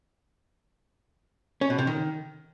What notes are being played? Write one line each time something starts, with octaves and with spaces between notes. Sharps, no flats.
C#4
B2
C3
D#3